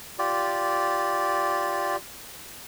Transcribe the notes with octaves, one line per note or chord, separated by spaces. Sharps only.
F4 G4 D5